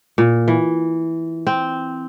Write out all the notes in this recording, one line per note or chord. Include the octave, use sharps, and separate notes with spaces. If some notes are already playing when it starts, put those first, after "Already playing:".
A#2
E3
C4